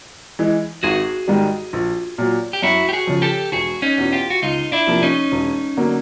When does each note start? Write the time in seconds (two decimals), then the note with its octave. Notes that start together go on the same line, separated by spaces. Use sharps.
0.39 E3 G#3
0.83 G#1 F#4 G#4
1.28 G#2 D#3 G3
1.73 A#1
2.18 A#2 F#3
2.53 G4
2.62 F#2 E4 F#4
2.89 G4
2.93 F#4 G#4
3.07 C#3 F3
3.22 G4 A4
3.52 E1 F#4 G#4
3.82 C#4 D#4
3.98 E2 B2
4.12 F4 G4
4.30 F#4
4.42 C#2 D#4 F4
4.72 D4 E4
4.87 C3 F3 A#3
5.03 C#4 D#4
5.32 E1
5.77 D3 F#3 A#3